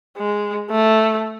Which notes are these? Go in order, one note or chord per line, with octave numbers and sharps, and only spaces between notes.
G#3
A3